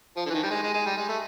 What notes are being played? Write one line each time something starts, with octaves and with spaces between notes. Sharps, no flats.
F3
D3
E3
D#3
G3
G#3
G#3
G#3
G3
G#3
A3